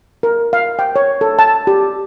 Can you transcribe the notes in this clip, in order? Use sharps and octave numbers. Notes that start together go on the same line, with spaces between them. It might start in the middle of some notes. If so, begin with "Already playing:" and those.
A#4
F5
G5
C#5
A4
A5
G4